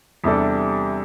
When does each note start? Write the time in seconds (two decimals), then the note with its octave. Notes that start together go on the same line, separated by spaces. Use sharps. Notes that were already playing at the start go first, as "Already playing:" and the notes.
0.24 E2 C3 G3 D4 A4